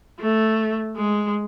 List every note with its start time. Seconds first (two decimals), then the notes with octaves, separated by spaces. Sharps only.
0.20 A3
0.96 G#3